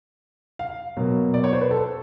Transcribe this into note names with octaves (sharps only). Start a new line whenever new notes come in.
F5
B2 F#3 A#3
D5
C#5
C5
B4
A4